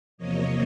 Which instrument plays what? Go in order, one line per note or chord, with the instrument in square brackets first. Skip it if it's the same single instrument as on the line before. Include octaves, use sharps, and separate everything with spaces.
[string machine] E2 C3 F3 A#3 C#5 D#5